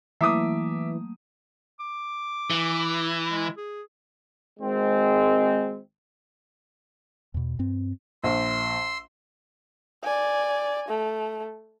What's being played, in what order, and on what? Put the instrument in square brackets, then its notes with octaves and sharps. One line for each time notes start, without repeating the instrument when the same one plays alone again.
[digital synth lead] E3 [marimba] F#3 A3 A#3 [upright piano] E5 D6 D#6
[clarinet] D6
[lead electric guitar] E3
[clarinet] E4
G#3
G#4
[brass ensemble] G#1 G#3 C4
[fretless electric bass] E2 B2
G2 C4
[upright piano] A#1 [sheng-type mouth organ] C6 E6
[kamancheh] D5 G#5
A3